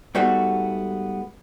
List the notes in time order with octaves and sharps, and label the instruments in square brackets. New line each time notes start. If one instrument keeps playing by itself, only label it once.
[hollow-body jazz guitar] G#2 G3 A3 B3 F#4